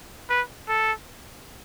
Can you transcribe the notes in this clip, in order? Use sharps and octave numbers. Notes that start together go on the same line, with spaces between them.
B4
A4